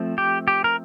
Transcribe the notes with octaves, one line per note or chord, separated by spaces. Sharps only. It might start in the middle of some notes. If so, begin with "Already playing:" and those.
Already playing: F3 A3 C4
G4
G4
A#4